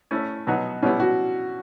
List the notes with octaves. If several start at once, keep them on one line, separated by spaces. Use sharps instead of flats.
A3 C#4 E4
B2 F#3 B3 D#4 F#4
B2 G3 B3 C#4 E4
F#4